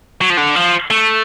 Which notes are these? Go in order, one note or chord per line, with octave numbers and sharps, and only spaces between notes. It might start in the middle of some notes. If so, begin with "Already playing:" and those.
F#3
F3
D3
F3
A3